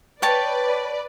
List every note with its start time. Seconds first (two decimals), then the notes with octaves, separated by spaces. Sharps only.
0.22 B4 C#5 D5 G5 A5